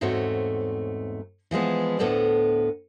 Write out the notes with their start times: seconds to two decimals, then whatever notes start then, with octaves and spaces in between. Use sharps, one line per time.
0.01 E2 G#2 A3 C4 F#4 C#5
1.51 E3 F3 G#3 B3
1.99 D2 A2 B3 A4 C5 D5